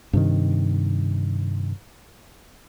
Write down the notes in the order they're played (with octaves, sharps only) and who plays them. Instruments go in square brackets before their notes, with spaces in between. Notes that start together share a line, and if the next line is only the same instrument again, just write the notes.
[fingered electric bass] G2 C3 D#3